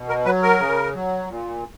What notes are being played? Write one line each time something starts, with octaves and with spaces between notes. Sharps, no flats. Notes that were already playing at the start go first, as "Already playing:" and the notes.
Already playing: B2
A#4
F#3 B4
A#4
C#3
F#3
A#2